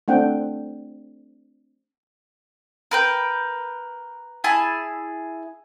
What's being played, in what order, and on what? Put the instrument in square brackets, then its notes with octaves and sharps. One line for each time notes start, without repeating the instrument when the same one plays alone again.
[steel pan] A3 C4 D4 F#5 G5
[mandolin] A#4 B4 G5
E4 G#4 G#5 A5